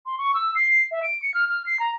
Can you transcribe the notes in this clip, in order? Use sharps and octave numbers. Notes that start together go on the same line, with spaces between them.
C6
C#6
E6
C7
E5
D7
C#7
F6
F6
C7
A#5